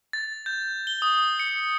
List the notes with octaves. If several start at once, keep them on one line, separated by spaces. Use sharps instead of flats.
A6
G6
G7
D#6
C#7